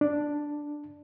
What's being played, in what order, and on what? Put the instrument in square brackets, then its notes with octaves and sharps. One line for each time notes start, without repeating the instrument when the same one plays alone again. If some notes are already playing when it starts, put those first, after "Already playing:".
[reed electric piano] D4